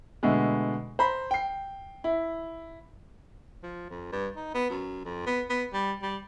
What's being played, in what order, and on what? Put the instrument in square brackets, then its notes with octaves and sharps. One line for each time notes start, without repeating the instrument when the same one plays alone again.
[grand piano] B2 D3 G#3 A3 B3
C5 A#5 B5
G5 C7
E4
[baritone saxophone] F3
F2
G2
D#4
B3
F#2
F2
B3
B3
G3
G3